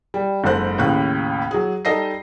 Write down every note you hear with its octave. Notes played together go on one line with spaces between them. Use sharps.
G3
F#1 G#2 A4 C5 F#6
D#2 A2 C#3 F#6
F#3 G#4
G3 D#4 A4 D#5 A#6 C7